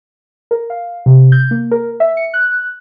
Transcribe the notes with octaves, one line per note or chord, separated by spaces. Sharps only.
A#4
F5
C3
G6
A#3
A#4
E5
C#7
F#6